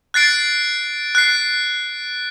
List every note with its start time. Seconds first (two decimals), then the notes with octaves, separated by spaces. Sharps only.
0.14 F#6 A6 C7 D7
1.15 F#6 C7